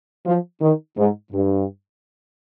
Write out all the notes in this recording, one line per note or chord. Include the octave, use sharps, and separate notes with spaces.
F3
D#3
G#2
G2